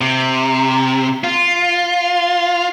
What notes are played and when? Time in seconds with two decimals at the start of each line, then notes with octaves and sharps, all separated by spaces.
0.01 C3
1.24 F4